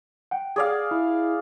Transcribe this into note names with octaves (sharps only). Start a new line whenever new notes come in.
F#5 G5
G#4 D5 F5
E4